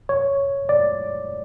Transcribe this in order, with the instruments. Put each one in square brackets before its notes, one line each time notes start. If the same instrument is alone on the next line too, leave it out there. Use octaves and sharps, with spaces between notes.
[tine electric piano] C#5
D5